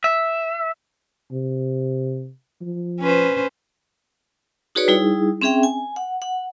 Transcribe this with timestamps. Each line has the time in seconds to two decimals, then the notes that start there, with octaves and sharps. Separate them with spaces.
0.04 E5
1.31 C3
2.61 F3
3.00 C#4 B4 C5
4.75 D#4 F#4 G#4 B4 C#5 D5
4.88 G3 D#4 E4 G#4
5.41 C4 C#4 G#4 E5 G5
5.63 G#5
5.96 F#5
6.22 F#5